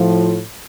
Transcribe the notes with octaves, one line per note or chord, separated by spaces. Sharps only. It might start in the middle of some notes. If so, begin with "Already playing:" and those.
Already playing: A2 F3